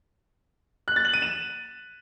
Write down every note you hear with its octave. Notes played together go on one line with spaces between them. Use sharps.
F#6
A6
F#7
D#7
E7